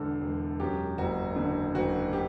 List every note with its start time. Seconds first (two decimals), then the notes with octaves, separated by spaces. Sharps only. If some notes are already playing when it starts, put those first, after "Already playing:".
Already playing: E1 E2 D3 A4
0.21 E1
0.60 F#2 G4
0.98 F#1 F#4
1.36 D3
1.74 F#1 F#4
2.13 G4